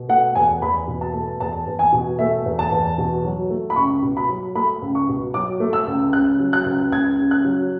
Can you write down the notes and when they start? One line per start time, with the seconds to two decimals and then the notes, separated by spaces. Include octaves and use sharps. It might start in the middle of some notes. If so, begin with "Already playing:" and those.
Already playing: B2
0.09 A3 F#5
0.35 E2 G#5
0.62 E2 B5
0.87 B2
1.01 A5
1.13 A3
1.40 E2 A5
1.67 E2
1.79 G#5
1.92 B2
2.19 A3 E5
2.46 E2
2.59 A5
2.72 E2
2.98 B2
3.24 F#3
3.50 A3
3.70 B5
3.76 C#2 C#6
4.03 B2
4.17 B5
4.29 F#3
4.55 A3 B5
4.82 C#2
4.95 C#6
5.09 B2
5.34 F#3 D6
5.60 A3
5.73 E6
5.87 C#2
6.12 C#3 F#6
6.39 F#3
6.53 F#6
6.66 C#2
6.91 C#2 G#6
7.19 C#3
7.31 F#6
7.44 F#3